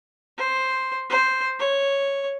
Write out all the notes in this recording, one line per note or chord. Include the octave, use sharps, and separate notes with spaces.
C5
C5
C#5